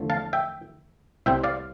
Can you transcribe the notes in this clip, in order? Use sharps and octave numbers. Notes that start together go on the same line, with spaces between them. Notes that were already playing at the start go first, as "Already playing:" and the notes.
Already playing: E2 D3 F3 A3
F5 A5
E5 G5
C2 C3 G3 C4 E5 G5
D5 F5